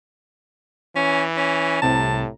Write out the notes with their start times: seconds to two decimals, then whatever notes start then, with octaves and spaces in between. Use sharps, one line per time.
0.96 E3 C#4
1.37 C#4
1.82 C2 A2 C3 A5 A#5